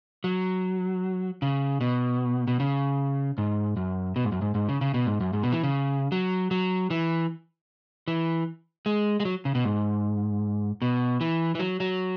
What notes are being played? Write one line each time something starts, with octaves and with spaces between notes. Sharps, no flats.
F#3
C#3
B2
B2
C#3
G#2
F#2
B2
G#2
F#2
G#2
G#2
C#3
C#3
B2
G#2
F#2
G#2
B2
E3
C#3
F#3
F#3
E3
E3
G#3
G#3
F#3
C#3
B2
G#2
B2
E3
E3
F#3
F#3